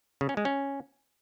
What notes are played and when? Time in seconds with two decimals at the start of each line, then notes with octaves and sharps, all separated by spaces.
0.21 C#3
0.29 C#4
0.37 G#3
0.45 C#4